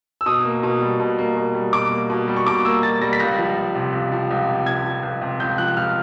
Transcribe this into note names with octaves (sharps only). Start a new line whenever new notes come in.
E6
B2 D#6
A#3
B2
G3
B2
A#3
B2
G3
B2 D6
A#3
B2
G3
C#6
B2 D6
A#3 E6
B2 A6
G3 A#6
B6
C#2 A#6
F3
C#2
C3
C#2
F3
C#2
C3
C#2 G#6
F3
C#2
C3
C#2 G6
F3 F#6
C#2 F6